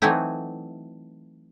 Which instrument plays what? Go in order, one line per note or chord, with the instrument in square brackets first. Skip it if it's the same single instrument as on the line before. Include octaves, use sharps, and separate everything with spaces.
[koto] E3 F#3 A3 C4 D#4 E4